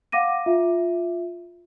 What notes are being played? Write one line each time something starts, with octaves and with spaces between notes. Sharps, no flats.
F5 F#5 D6 A#6 D#7
F4 E5